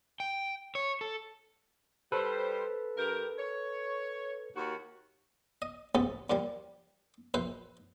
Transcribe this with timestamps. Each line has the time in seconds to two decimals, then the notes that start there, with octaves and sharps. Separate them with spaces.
0.20 G5
0.75 C#5
1.01 A4
2.12 G3 A4 B4 C5
2.97 G2 G4 A#4
3.38 C#5
4.55 D#2 F#4
5.62 D#5
5.95 A1 G#2 C3 B3 A4
6.30 D#2 A#2 F3 G3
7.34 A#1 B4 C5 E5